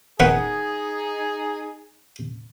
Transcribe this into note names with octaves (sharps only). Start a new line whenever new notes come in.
D#3 B3 D#4 G#4 F#5